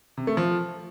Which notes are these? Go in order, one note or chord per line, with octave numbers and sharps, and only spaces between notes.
C3
A3
F3